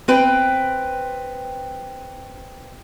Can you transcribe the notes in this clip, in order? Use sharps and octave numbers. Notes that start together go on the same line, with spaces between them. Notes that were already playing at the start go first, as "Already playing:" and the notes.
C4 B4 G5